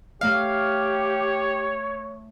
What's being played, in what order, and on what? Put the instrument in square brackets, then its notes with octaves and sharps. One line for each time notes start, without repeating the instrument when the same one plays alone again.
[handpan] A3 D5 [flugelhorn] G4 [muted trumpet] C#5 [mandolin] F5